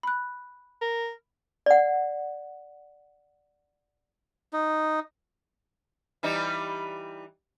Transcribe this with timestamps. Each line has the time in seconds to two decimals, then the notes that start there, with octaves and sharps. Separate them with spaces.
0.03 B5 F#6
0.81 A#4
1.66 D5 F#5
4.53 D#4
6.23 E3 G3 D#4